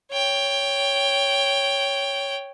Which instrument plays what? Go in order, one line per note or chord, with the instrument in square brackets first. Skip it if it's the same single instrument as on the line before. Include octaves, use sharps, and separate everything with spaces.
[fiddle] C#5 G5